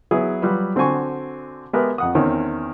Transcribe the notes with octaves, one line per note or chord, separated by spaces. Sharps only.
F#3 B3 E4 G#4
F#3 G3 F4 B4
D3 C4 F#4 C5 G#5 C#6
G#3 B3 G4 A#4 B4 E5
F2 F#5 D#6
E2 D#3 C4 C#4